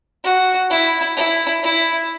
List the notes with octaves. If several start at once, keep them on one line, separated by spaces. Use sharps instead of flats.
F#4
E4
E4
E4